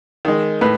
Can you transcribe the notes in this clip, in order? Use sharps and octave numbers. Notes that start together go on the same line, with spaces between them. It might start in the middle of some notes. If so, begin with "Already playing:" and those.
D#3 G#3
A2 B4